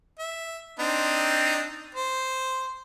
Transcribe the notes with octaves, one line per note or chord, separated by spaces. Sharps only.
E5
C4 D4 D#4
C5